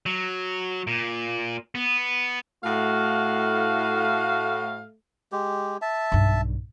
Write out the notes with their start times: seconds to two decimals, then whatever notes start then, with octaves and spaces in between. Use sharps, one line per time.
0.06 F#3
0.87 A#2
1.75 B3
2.64 A2 A3 F#4 F5
5.32 G#3 G4
5.82 E5 A5
6.12 B1 G2